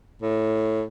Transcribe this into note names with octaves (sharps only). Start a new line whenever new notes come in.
A2